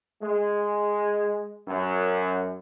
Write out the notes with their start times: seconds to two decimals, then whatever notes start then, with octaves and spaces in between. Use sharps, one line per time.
0.22 G#3
1.68 F#2